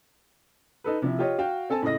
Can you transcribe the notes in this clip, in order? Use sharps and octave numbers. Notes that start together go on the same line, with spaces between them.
D#4 A4 B4
C3 F3 E4
F4 G4 C#5 D#5
F#4 F5 G5
C4 A4 G#5 A5
A2 C#3 A3 D#5 A#6